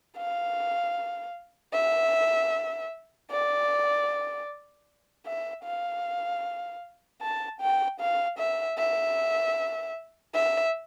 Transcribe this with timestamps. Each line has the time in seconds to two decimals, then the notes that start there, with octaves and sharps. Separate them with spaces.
0.17 F5
1.73 E5
3.31 D5
5.26 E5
5.64 F5
7.21 A5
7.61 G5
8.00 F5
8.38 E5
8.78 E5
10.34 E5